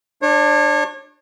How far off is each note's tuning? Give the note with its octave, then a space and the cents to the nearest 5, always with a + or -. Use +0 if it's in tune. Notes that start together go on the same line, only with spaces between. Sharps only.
D4 +20 C#5 -30